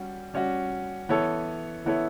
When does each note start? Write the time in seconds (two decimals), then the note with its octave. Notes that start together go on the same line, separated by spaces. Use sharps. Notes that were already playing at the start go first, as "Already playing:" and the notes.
Already playing: G3 C#4 F#4
0.34 G3 C#4 F#4
1.09 E3 B3 E4 A4 C#5
1.85 E3 B3 E4 A4 C#5